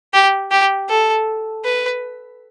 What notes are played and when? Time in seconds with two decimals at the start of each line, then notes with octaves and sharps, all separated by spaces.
0.13 G4
0.51 G4
0.89 A4
1.65 B4